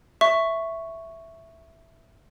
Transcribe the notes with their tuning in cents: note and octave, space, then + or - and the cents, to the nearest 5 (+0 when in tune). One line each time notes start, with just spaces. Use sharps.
E5 +0 C#6 +0